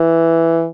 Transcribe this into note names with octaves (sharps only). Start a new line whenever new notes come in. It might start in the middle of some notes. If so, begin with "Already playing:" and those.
Already playing: E3